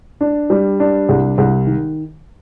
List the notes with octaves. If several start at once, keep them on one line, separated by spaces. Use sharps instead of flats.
D4
G3
D4
C2
C2
D#3